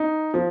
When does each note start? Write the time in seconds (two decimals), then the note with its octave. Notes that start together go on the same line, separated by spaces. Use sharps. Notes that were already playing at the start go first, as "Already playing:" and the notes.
Already playing: D#4
0.34 F3